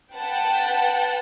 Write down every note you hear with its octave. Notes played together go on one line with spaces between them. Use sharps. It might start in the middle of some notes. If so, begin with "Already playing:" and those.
B4 F#5 G5 A5